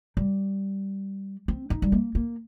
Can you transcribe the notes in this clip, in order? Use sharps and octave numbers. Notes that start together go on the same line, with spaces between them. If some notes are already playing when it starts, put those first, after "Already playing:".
G3
C4
D#4
G3
A#3
A#3